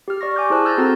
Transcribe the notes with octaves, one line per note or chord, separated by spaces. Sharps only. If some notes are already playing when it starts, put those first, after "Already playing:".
G4 F6
D5 C#6 A#6
G#5 C#6 D6 F6 G6
E4 G#4 C5 A5 F#6
E6 F6 G6 A6 A#6
C4 F#4 A4 A#5 G6 A6